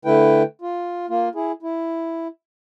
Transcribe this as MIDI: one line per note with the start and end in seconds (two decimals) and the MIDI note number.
0.05 0.43 50
0.05 0.43 57
0.05 0.43 64
0.05 0.43 71
0.05 0.43 79
0.62 1.06 65
1.09 1.29 58
1.09 1.29 65
1.35 1.52 64
1.35 1.52 68
1.63 2.27 64